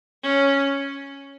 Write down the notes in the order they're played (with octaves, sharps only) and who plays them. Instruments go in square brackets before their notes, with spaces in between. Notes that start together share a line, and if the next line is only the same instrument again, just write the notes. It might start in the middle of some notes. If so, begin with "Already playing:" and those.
[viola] C#4